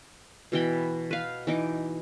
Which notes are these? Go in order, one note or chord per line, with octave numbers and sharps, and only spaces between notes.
B2 E3 G5 B5
B4 F5
E3 D#4 D6